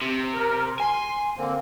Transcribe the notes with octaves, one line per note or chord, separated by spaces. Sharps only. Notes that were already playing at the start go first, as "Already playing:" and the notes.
C3
A#4
G#5 C6
D3 A#3 C4